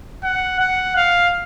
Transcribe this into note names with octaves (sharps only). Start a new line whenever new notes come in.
F#5
F#5
F5